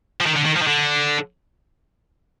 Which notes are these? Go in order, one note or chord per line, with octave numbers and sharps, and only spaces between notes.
F3
D#3
D3
D#3
F3
D#3
D3